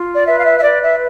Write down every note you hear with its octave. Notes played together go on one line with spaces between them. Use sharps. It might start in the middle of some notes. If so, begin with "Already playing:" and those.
Already playing: F4
D5
B4 E5
F5
E5
E5
B4 D5
E5